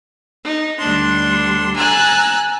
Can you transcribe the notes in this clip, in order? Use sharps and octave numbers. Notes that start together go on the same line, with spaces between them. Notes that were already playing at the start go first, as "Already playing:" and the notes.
D#4
D2 G3 D4 C6
G#5 A#5 E6 F#6 A6